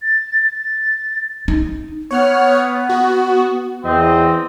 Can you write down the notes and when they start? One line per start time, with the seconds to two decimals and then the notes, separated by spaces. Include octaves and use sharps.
0.02 A6
0.50 A6
1.48 D#4
2.11 B3 C#5 F#5 F6
2.89 F#4
3.84 E2 C4 D#5